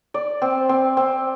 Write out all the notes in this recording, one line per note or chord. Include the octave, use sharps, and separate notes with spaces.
D5
C4
C4
C4